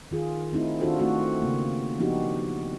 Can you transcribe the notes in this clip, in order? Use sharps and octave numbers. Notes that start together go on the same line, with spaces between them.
D#3 F4 G#4
A3 C4 D#4 E4
D#3 D4 F4 F#4 A4 C5
A3 C4 F4 F#4
C#3 A#3
F3 B3 D4 D#4 F#4 G4